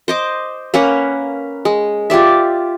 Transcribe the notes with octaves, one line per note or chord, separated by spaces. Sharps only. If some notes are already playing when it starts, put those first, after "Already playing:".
C5 D#5 D6
A#3 C#4 B4 F#5
G#3
F4 G4 D5 E5